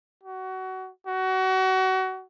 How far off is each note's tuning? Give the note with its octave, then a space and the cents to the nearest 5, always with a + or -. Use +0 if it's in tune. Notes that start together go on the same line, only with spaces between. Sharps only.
F#4 +25
F#4 +30